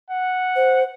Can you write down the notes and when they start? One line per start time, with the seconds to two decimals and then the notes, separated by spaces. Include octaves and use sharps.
0.10 F#5
0.56 C5